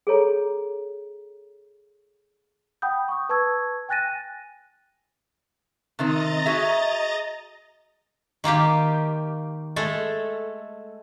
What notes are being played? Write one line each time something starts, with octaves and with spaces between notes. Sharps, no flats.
G#4 A4 C#5 A#5
F#5 G5 B5 D#6 G6
C#6 D#6
B4 A5 C#6 E6 G#6
G5 G#5 F#6 A6 A#6 D#7
C3 D#3 C4 D#5 A#5 A6
F#4 G#4 E5
D#3 A#3 F4 G4
G#3 A3 A4